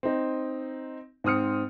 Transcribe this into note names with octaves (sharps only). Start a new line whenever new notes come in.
C4 D#4
G#2 C4 D#6 F6 C#7